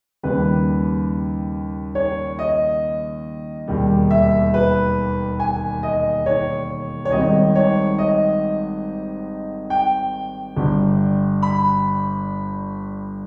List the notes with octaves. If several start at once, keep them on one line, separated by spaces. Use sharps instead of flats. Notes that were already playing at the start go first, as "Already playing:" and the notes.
D#2 C#3 G3 B4
C#5
D#5
E1 D#2 D#3 G3
E5
B4
G#5
D#5
C#5
C#5
G#1 G#2 D#3 G3 D#5
C#5
D#5
G5
G1 G2 G3
B5